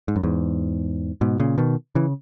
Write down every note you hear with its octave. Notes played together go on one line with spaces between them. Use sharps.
G#2
F#2
E2 G#2
G#2 B2
A#2 C#3
B2 D#3
C#3 E3